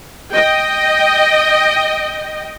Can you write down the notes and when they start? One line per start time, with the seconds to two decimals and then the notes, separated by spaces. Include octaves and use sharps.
0.33 D#5 G5